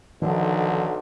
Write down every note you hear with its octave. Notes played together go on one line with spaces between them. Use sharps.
B1 D3 D#3 F3